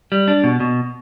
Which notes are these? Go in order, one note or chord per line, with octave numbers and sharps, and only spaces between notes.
G3
D4
B2
B2